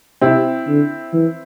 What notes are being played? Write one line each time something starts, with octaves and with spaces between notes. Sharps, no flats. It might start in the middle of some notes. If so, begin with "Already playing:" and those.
C3 C4 E4
D3
E3